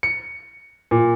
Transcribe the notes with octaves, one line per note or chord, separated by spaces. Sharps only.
C#7
A#2